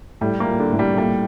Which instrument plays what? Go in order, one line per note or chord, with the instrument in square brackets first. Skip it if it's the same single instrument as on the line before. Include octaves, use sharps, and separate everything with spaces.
[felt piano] A2 [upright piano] G3
[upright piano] A#3
[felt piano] A#2
[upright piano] D3
[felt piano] A2
[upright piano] G3
[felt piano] A#2 [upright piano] G3